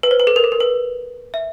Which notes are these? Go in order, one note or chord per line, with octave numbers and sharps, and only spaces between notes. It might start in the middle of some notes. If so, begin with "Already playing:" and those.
B4
C5
B4
A4
A#4
A4
A#4
B4
E5